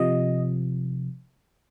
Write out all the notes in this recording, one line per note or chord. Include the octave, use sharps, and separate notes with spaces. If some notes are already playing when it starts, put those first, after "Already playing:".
Already playing: C3 F3 D#5